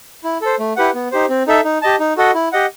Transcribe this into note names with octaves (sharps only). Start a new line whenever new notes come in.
E4
A4 C5
A3
E4 G4 B4 F#5
B3
D#4 G4 C5
C4
D#4 A4 E5
D#4
G4 D#5 A5
D#4
F#4 A4 D#5 F#5
E4
G4 D#5 F#5